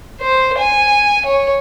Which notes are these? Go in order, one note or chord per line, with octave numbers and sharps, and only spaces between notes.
C5
G#5
C#5